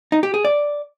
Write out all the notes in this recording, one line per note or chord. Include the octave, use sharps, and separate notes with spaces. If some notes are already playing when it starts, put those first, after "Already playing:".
D#4
G4
G#4
D5